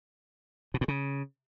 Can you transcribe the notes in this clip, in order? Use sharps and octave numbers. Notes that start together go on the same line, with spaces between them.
B2
A2
C#3